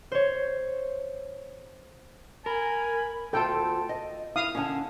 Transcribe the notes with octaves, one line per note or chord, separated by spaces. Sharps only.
C5 C#5
A#4 G#5 B5
D2 F4 A4 G5 A5
D#5
E4 F5 D#6
D3 C#4